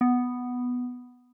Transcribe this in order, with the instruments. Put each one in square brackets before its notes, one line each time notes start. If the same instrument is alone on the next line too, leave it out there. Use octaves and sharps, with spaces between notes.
[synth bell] B3